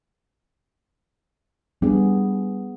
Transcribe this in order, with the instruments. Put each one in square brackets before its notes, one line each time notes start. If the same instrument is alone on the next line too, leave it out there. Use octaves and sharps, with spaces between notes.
[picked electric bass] G3 D4 [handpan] B3 G#4